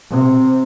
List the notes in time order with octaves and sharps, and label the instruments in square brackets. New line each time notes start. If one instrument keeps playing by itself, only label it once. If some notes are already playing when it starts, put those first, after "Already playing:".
[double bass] C3